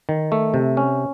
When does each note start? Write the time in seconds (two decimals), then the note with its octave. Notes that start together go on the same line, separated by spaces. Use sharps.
0.09 D#3
0.32 A3
0.54 C3
0.77 C#4